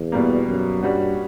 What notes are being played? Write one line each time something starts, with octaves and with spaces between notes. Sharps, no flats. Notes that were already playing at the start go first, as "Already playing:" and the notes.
Already playing: E2
B2 G3 A#3
F#2
G2 G3 C#4 F#4